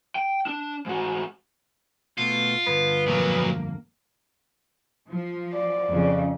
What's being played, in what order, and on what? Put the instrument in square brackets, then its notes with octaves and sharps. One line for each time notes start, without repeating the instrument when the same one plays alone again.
[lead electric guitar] G5
D4
G#2 F#4
[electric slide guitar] B2 A3 B3 [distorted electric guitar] F4
[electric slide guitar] G2 D3 [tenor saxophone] B3
[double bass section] F2 A#3 [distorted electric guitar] A#2 F#3
[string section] F3
[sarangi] D5
[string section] F2 C#3